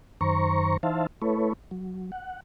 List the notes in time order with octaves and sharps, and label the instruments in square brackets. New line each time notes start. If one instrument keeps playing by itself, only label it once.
[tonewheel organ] F#2 D#3 C5 A#5 C#6
E3 D#4 C5 E5 F5 A5
A3 E4 A4 B4 C#5
F#3
F#5